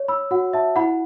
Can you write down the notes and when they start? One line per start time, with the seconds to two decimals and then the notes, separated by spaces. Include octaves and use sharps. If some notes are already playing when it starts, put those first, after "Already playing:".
Already playing: C#5
0.08 B5 E6
0.31 F#4 F#5
0.53 E5 A5
0.76 E4 F#5 B5